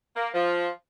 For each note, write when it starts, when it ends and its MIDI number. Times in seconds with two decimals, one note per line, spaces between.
0.15 0.28 58
0.33 0.68 53